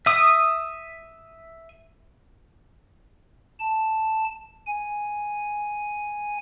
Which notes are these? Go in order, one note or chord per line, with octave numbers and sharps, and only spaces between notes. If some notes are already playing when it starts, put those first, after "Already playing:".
E5 D#6
A5
G#5